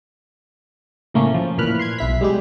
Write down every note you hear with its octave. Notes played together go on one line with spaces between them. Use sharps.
A2 C#3 A3 A#3 C#4
F3
A#2 E3 B5 F6 F#6
C6 F#6 G#6
B1 E4 B6
G3 G#3 G4